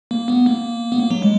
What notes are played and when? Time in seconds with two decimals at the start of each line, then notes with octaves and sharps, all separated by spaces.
0.11 A#3
0.28 B3
0.46 A#3
0.92 B3
0.99 A#3
1.10 F#3
1.22 G#3